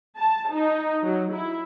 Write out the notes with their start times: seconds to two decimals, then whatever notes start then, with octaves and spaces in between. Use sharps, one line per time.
0.17 A5
0.52 D#4
1.04 F#3
1.34 E4